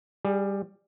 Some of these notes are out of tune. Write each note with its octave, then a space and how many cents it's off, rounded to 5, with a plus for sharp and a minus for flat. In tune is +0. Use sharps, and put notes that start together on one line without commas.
G3 +10 G#4 -15